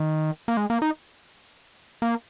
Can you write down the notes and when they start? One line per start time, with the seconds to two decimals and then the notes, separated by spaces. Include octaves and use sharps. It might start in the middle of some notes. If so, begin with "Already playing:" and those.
Already playing: D#3
0.48 A#3
0.57 G#3
0.70 A#3
0.82 D#4
2.02 A#3